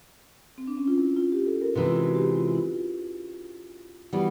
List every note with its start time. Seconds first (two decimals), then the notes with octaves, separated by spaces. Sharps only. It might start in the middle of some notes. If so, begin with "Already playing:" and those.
0.58 C4
0.67 D4
0.77 C#4
0.88 F4
0.98 E4
1.17 F4
1.32 G4
1.46 A4
1.61 A#4
1.75 C3 E3 G#3 C4 B4
1.86 F4
1.96 F#4
2.06 F#4
2.15 G4
2.35 F4
2.48 F4
2.55 E4
2.74 F4
4.13 E3 G3 B3 F#4